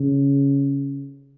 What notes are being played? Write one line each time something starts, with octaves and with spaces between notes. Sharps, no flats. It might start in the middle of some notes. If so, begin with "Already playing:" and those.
Already playing: C#3